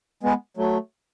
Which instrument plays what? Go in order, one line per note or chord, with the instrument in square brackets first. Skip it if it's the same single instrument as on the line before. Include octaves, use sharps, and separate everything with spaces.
[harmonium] G#3 B3
F#3 A3